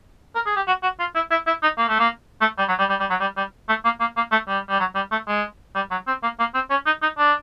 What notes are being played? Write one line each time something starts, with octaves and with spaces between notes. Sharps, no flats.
A#4
G#4
G4
F#4
F#4
F4
E4
E4
E4
D#4
A#3
A3
A#3
A3
G3
F#3
G3
G3
G3
F#3
G3
G3
A3
A#3
A#3
A#3
A3
G3
G3
F#3
G3
A3
G#3
G3
F#3
C4
A#3
A#3
C4
C#4
D#4
D#4
D4